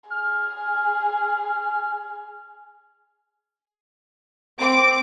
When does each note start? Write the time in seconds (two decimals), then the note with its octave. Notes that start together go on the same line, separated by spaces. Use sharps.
0.10 G#4 F6
4.59 C4 D6